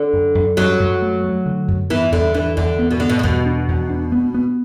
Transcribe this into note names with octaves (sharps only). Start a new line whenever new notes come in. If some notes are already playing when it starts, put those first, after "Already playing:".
Already playing: D3
F#2
F#2
F#2 F#3
F#2
A3
A3
D3
F#2
E3 B3
E2 D3
E3 D4
E2 D3
B3
B2
D3 B3
B2
A2
E2 B2
D4
E2
D4
B3
B3